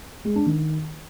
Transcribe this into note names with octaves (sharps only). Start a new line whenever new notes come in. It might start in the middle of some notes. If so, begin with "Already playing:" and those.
G#3
D4
D#3